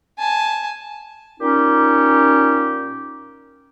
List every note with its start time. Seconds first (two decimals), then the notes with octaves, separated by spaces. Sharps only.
0.19 G#5 A5
1.40 A#2 C#4 D#4 G4